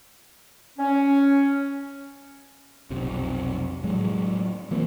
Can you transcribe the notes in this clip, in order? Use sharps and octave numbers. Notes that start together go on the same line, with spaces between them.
C#4
F1 B1 C3
A2 F#3 G#3
E3 F3 A#3 C4